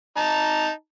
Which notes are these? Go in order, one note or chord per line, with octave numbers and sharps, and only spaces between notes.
D#4 A5 A#5